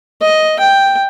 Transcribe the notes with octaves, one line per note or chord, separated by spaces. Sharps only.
D#5
G5